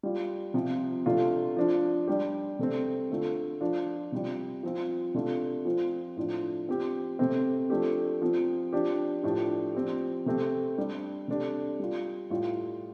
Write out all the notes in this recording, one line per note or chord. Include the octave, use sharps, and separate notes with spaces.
G3 F4
C3 F3 C4 F4
C3 A3 D4 F4
F3 D4 F4
G3 D4 G4
C3 A3 C4
D3 A3 F4
F3 D4 F4
C3 G3 F4
F3 C4 F4
C3 A3 D4 F4
F3 C4 F4
A2 F3 D4 F4
F3 C4 G4
C3 A3 C4 G4
F3 A3 D4 G4
F3 C4 F4
F3 D4 G4
A2 F3 D4 G4
F3 C4 G4
C3 A3 C4 G4
G3 D4 G4
C3 A3 D4 G4
G3 F4
A2 G3 F4